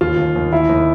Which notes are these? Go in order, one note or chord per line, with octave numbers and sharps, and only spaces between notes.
D#2 F4
D#2
D#2
D#2 E4
D#2